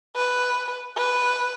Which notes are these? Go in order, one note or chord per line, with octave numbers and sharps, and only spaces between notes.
B4
B4